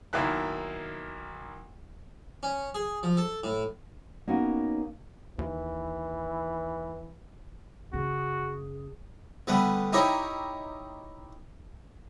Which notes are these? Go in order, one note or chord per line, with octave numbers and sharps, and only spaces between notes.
B1 D#3 A#3 E4 F#6
C#4
G#4
F3
A4
A2
A#3 B3 C#4 D#4 F#4
D#2 E3
F#1 C#3 F#4 G#4
D3 G3 A3 B3
D#4 E4 G4 C#5 D#5